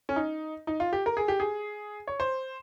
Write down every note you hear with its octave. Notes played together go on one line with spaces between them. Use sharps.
C#4
D#4
D#4
F4
G4
A#4
G#4
G4
G#4
C#5
C5